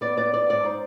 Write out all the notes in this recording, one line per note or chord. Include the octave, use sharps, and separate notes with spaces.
B3 D5
B3 D5
B3 D5
G#2 D5
D#4 C5